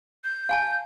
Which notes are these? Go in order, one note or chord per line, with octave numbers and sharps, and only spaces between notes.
G6
F5 G#5 A5